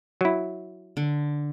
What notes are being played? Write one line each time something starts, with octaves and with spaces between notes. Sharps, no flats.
F#3 E4
D3